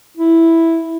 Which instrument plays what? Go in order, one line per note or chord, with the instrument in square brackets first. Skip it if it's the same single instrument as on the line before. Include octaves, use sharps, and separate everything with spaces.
[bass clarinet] E4